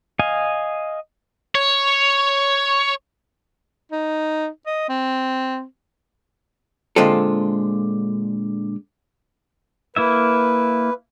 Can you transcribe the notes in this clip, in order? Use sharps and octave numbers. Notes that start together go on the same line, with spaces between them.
D#5 F5 G#5
C#5
D#4
D#5
C4
A#2 D3 G#3 C4 F4 A4
A#3 E4 B4 E5